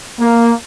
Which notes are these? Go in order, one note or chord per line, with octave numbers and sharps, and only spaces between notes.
A#3